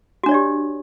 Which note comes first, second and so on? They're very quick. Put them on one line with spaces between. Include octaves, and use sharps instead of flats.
F#4 D4 C#5 D5 G4